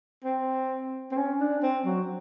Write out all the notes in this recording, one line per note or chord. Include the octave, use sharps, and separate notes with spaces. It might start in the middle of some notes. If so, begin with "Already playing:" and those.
C4
C4
C#4
D4
C4
F#3